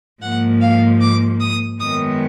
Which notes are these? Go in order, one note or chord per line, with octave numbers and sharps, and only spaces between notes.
G#2 F3 A#3 F#5
F5
D6
D#6
F#2 D#3 G#3 B3 D#6